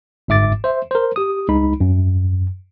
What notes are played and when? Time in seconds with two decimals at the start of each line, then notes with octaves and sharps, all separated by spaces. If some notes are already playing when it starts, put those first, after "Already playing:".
0.28 G1 G#2 E5 D6 A6
0.64 C5 E5
0.91 A#4 C5
1.16 G4 D#6
1.49 C#2 G#3 D#4 B5
1.80 F#2